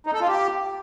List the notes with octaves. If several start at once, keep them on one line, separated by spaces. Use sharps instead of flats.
D#4
A4
F4
G4